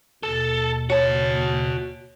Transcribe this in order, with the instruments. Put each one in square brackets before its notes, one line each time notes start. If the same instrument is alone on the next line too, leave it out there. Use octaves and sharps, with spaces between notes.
[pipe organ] D#2 B2 [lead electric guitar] A4
[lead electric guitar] F#4 A5 [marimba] C#5